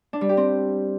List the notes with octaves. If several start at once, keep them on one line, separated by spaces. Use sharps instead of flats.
D4
G3
G4
C4